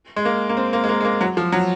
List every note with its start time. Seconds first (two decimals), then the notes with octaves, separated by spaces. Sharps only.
0.16 G#3
0.25 A#3
0.49 A#3
0.57 C4
0.73 A#3
0.84 G#3
0.89 A#3
1.01 G#3
1.05 A#3
1.21 F#3
1.37 F3
1.52 F#3